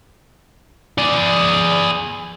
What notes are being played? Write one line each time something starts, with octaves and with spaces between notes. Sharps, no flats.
G#4 D5